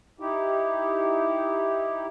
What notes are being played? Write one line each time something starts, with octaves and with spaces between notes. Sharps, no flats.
D#4 E4 G4